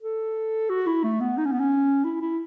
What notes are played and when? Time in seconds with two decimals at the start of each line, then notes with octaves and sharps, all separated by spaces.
0.03 A4
0.70 F#4
0.86 E4
1.04 A3
1.20 B3
1.37 D#4
1.45 C#4
1.52 B3
1.60 C#4
2.04 E4
2.21 E4